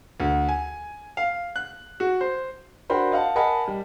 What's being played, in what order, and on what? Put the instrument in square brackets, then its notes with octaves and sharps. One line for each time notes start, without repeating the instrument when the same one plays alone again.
[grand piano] D2
G#5
F5
F#6
F#4
C5
D4 F#4 A#4 C5 B5
D#5 F5 F#5 A5
A#4 D#5 F#5 G#5 A5 B5
G3